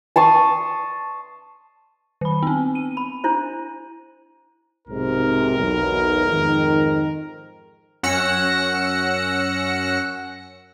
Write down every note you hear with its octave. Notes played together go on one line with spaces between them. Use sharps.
A5 C6 C#6 D#6
D#3 B5
B3 C4
D#7
B5
D4 E4 C5
B1 G#2 C3 A#4
B1 E2
F2 G#2 D#3
F#2 C#4 F#5 E6 A#6 C#7